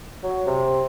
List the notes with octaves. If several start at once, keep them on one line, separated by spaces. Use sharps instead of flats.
F#3
C3